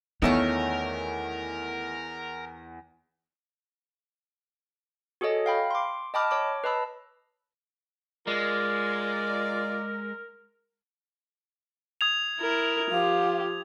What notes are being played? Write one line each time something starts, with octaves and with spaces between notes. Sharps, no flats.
E2 D#3 A3 B3 C#4 A#4 C#5
F#4 G#4 A4 C#5 D#5
F5 G5 B5
C6 D6
D#5 G5 A5 B5 D6 F6
C#5 D6
B4 D#5 A5 B5 E6
G#3 F4 A#4 D5
D#6 G#6 F7
E4 A#4
F3 G4 F5